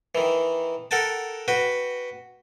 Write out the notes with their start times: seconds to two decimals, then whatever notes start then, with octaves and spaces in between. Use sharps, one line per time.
0.15 D#3 E3
0.91 A4 A#4 F#5 G5 A5
1.48 F#4 B4 G5